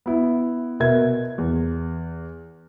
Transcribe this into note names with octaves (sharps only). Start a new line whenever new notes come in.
B3 E4
B2 A#4 E5 G#6
E2